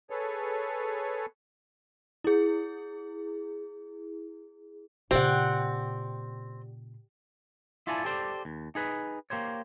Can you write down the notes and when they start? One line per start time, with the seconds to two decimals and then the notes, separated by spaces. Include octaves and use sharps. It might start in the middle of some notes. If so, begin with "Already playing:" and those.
0.10 G#4 A4 B4 C#5
2.24 E4 G#4
5.11 A#2 C#3 C4 G4 D5 F#5
7.87 E4 F4 A4 D5 G#5 A5
8.05 G4 A4 C5 D5
8.45 D#2
8.75 D#4 G#4 B4
9.30 A#3 G4 C5 C#5